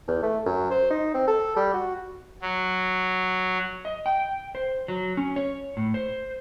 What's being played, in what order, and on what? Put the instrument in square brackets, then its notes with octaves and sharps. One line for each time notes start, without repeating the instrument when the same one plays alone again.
[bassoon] E2
A3
F#2
C5
D#4
C4
A4
G3
F#4
[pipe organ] F#3
[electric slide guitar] D#5
G5
C5
F#3
C#4
C#5
A2
C5